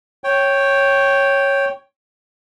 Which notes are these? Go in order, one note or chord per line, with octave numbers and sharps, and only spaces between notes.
C#5 G5